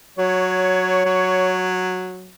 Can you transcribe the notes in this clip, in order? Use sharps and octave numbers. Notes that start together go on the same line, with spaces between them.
F#3 C#5
F#3